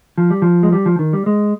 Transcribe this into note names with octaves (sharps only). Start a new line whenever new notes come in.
F3
G3
F3
G#3
G3
F3
D#3
G3
G#3